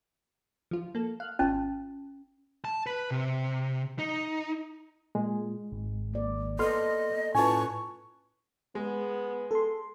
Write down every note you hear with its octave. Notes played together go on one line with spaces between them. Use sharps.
F3 F4
A#3 A4
F5 F6 F#6
G#1 C#4 F4 A5
A5
B4
C3
D#4
A#2 G#3
G#1
A#3 D5
B3 A4 D#5 C6 F6
A2 C#4 F4 B4 G#5 A5 C#6
G#3 B3
A4 C6